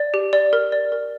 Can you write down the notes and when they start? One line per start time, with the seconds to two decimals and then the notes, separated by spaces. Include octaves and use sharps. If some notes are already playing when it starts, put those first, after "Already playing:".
Already playing: D5
0.14 G4
0.33 D5
0.53 A#4
0.72 D5
0.92 A#4